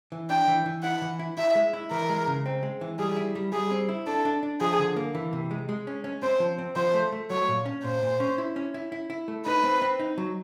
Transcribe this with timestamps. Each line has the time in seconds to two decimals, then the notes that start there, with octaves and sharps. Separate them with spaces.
0.12 E3
0.30 D4 G5
0.48 E3
0.66 E3
0.83 E4 F#5
1.02 E3
1.19 E4
1.37 E4 E5
1.55 G#3
1.73 E4
1.91 E3 A#4
2.09 G#3
2.27 C#3
2.46 C4
2.63 G#3
2.81 E3
2.99 G3 G#4
3.16 E4
3.35 G3
3.53 G3 G#4
3.71 C4
3.89 E4
4.07 D4 A4
4.25 D4
4.43 D4
4.61 F3 G#4
4.79 D3
4.96 A#3
5.15 E3
5.33 C3
5.51 G#3
5.69 G#3
5.87 C#4
6.04 C#4
6.22 C4 C5
6.40 F3
6.59 C4
6.76 F3 C5
6.94 A3
7.12 A3
7.30 F#3 C#5
7.48 A#2
7.66 C#4
7.84 A#2 C5
8.03 A#2
8.20 C#4
8.38 E4
8.56 C#4
8.74 E4
8.92 E4
9.10 E4
9.28 A3
9.46 D#4 B4
9.64 C4
9.82 C4
10.00 D#4
10.18 F#3